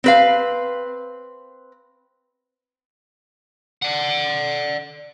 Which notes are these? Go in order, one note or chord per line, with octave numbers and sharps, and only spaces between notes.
C4 B4 F5
D5 F#5